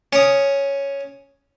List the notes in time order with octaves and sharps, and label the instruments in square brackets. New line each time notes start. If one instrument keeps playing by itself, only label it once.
[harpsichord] C#4 D#6